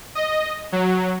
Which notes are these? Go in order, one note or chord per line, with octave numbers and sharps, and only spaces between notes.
D#5
F#3